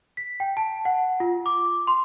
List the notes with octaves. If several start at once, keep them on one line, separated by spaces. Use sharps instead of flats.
B6
G5
A5
F#5
F4
D6
C6